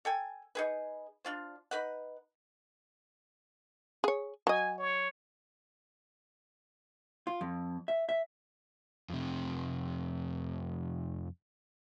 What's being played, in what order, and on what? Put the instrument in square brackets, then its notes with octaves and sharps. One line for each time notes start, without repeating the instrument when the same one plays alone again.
[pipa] A4 G5 G#5
D#4 G#4 B4
D4 F4 C5
D#4 B4 F#5
[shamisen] G#4 C#5
[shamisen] F#3 D#5 [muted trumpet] G#5
[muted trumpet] C#5
[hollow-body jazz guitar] F4
F2
E5
E5
[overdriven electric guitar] F2 C3